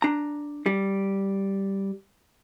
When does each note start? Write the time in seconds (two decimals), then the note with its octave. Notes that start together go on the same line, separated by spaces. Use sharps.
0.02 D4 A#5
0.66 G3